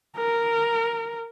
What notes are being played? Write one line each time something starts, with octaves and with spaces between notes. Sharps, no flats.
A#4